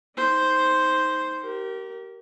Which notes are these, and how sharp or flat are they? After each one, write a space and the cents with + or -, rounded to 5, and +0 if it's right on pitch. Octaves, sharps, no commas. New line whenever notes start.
D#4 +25 C5 +0
G4 -30 A#4 +0